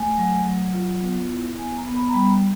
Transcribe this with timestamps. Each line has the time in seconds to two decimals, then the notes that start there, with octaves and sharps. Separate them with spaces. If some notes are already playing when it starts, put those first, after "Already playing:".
Already playing: A3 G#5
0.17 F#3
0.45 F#3
0.73 F4
1.02 B3
1.30 E4
1.57 B3 G#5
1.77 A#5
1.87 B3
1.95 B5
2.09 A#5
2.14 G3 B5